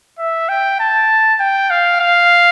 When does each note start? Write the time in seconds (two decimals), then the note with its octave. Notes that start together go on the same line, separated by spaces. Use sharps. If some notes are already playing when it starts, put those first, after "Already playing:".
0.19 E5
0.49 G5
0.80 A5
1.40 G5
1.70 F5
2.00 F5